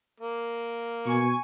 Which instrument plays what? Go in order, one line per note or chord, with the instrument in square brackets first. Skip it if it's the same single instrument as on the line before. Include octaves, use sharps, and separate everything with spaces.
[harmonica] A#3
[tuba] B2 [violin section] G#5 C#6